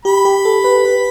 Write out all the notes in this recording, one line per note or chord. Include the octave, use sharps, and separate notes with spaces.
G4 B5
G4
A4
B4
B4